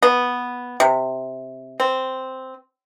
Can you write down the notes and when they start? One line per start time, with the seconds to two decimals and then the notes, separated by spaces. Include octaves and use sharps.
0.03 B3
0.80 C3
1.80 C4